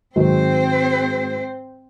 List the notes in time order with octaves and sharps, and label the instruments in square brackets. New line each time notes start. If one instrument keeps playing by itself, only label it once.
[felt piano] G#2 D#3 F#3 [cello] C4 C5